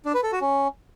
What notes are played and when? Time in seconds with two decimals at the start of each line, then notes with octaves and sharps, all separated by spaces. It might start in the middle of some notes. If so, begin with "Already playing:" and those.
0.05 D4
0.14 B4
0.23 A4
0.32 F#4
0.41 C#4